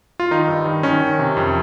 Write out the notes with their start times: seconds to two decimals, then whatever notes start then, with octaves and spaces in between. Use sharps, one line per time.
0.20 F4
0.31 D#3 D#4
0.48 G2
0.66 D#3
0.83 D#3 C#4
1.02 D#3
1.19 C3
1.37 F2